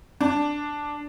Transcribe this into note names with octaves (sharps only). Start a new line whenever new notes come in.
D4